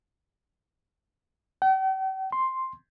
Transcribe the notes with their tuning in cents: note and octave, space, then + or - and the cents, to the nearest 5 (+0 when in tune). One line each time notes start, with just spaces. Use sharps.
G5 -45
C6 +5